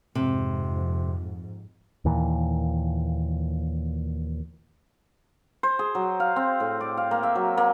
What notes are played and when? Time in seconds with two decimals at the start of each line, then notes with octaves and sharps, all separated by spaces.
0.15 F2 G#2 C3
2.05 D#2 A#2 E3
5.63 C5
5.79 G#4
5.95 F#3
6.20 F5
6.36 C4
6.60 A2
6.81 D5
6.97 F5
7.11 A#3
7.23 E5
7.35 F#3
7.57 A#3